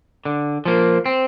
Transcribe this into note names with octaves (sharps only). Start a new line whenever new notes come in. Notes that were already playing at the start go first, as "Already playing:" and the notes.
D3
F3 A#3
C4